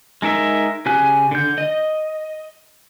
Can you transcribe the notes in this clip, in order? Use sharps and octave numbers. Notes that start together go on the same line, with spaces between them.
G#3 D#4 A#4 E5
C#3 G4 G#5 F#6
D3 G6
D#5